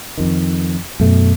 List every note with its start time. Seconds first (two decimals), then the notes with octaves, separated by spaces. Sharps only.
0.18 F2 D#3
1.00 F#2 B2 A3